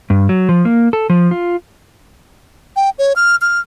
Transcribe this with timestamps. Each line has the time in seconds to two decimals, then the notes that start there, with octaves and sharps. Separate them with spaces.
0.10 G2
0.29 F#3
0.49 F3
0.65 A#3
0.93 A4
1.10 F3
1.31 F4
2.76 G5
2.99 C#5
3.16 F6
3.41 F6